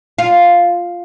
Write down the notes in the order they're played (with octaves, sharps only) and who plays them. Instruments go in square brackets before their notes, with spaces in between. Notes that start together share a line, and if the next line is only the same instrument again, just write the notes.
[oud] F4